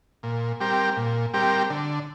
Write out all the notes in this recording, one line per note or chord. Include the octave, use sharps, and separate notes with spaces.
A#2
G3 C4 G4 A#4
A#2
G3 C4 G4 A#4
D3